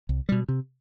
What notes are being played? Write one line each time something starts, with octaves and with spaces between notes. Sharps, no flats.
C2
B2 G3
C3